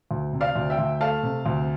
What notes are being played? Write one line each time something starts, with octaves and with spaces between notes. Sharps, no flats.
D2
C3
D5 F5
D2
E5 G5
D2
A3 F5 A5
C3
D2